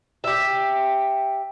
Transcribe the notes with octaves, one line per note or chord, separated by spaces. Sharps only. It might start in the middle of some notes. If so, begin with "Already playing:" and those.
G4 E5